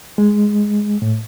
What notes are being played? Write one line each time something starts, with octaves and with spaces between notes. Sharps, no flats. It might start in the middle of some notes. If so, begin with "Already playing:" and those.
G#3
A2